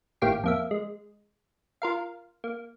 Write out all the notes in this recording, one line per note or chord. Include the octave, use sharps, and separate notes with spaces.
G#1 A2 A#3 G4 G5 C7
F2 A#3 E5
G#3
F4 A#4 F5
A#3